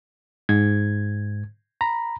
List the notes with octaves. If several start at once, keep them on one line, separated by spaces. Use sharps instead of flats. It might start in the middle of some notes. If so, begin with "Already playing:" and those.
G#2 G#6
A#5 B5